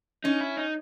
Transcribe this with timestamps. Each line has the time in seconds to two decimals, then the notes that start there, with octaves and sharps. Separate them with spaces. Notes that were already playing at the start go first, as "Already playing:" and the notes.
0.24 C#4 D#4
0.41 E4
0.57 D#4